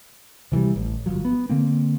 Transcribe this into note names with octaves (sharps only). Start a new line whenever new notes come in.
C3 E3 F3 G3
A1
G1 F#2 F3 F#3
B3
D3 A#3 C4